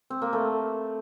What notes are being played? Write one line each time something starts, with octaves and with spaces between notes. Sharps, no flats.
C4
A#3
A3